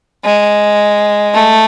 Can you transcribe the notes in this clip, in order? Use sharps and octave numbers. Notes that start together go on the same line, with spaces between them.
G#3
A3